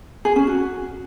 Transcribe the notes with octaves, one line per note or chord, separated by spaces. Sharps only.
G#4
C#4
F#4